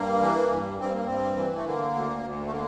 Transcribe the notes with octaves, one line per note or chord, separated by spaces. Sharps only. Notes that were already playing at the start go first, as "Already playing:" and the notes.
Already playing: G2 A#3
E3
G2
G2 C4
A#3
G2 C4
E3
A3
D3 A#3
D2
D2
A3
D3 A#3